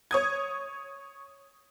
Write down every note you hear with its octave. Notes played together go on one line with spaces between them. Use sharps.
C#5 D#6 G#6